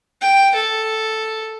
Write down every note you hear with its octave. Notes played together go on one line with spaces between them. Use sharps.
G5
A4